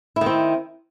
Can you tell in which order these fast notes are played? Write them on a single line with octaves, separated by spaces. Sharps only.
E4 D#3 C4